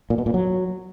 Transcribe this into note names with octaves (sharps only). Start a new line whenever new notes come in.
A#2
B2
A#2
F#3